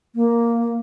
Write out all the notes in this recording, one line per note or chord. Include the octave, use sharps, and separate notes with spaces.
A#3